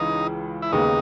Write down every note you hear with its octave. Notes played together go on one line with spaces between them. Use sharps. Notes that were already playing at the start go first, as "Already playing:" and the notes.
Already playing: C#2 C#3 E3 D#4
E4
D#2 C#3 G#3 B3 D#4